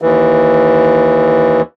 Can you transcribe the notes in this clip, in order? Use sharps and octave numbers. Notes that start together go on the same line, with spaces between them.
D#2 E3